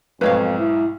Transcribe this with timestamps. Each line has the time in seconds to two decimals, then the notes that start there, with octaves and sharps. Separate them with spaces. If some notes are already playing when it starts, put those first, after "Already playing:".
0.21 B1 F2 G#2 B4 C#5 F5
0.58 E4